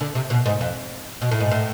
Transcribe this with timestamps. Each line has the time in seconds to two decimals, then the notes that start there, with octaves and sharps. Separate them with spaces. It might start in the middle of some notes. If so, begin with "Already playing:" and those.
0.01 D3
0.15 C3
0.30 B2
0.46 G#2
0.61 F2
1.22 B2
1.31 A2
1.40 G#2
1.51 A2